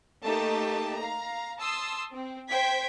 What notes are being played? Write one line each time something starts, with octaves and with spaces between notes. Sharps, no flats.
A3 A#3 D#4 G4 A5
F5 A#5
A5 C6 D#6 E6
C4
C5 G5 G#6 B6